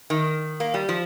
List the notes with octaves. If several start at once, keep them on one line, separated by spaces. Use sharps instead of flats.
D#3
A#3
G3
F3